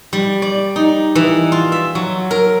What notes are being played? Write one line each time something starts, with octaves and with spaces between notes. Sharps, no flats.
G3
D5
D#4
E3
F4
E5
F#3
A#4